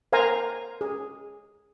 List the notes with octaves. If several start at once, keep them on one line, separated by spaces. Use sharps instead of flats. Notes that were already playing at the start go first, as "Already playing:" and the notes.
A#4 C5 F5 G#5 A#5
G#4